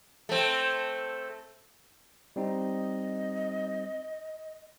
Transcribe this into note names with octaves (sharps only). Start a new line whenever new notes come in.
A3 C4
G3 C4 D#4 D#5